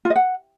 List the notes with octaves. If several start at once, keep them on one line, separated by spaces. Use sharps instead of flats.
F4
D#5
F#5